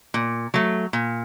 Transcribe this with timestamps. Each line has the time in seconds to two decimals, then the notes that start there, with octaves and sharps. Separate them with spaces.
0.14 A#2
0.54 F#3 A3
0.93 A#2